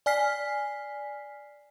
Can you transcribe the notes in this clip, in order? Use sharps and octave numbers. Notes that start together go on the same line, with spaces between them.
D5 G#5 F6 B6 C7